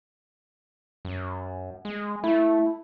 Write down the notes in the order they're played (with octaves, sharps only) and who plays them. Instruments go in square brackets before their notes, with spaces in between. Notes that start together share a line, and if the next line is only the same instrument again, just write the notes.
[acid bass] F#2
G#3
[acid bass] A3 [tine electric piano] E4